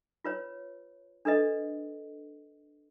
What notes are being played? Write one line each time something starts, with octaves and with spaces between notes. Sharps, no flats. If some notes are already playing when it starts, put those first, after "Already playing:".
F4 B4 C#5
D4 A4 B4 D#5